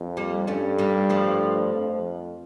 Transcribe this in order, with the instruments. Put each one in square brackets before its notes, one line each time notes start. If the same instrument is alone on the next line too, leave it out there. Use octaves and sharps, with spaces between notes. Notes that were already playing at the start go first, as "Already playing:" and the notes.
Already playing: [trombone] F2
[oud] G3 A#3
[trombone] G2 [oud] A3 C#4
[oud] G3 A#3
F3 A3
[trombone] F2